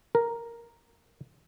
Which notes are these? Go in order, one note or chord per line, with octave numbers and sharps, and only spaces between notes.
A#4